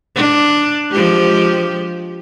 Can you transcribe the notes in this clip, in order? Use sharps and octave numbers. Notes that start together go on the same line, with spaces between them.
D4
F3 G#3 G4